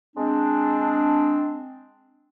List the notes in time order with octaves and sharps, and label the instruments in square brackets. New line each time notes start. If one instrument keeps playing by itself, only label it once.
[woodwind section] G#3 C4 D4